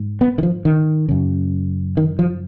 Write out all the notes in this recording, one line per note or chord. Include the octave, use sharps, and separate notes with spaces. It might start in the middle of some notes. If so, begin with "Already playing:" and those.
Already playing: G#2
B3
D#3
F3
D#3
F#2 C#3
D#3
F3